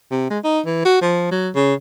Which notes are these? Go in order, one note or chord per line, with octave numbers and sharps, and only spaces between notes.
C3
G#3
D#4
E3
F#4
F3
F#3
C#3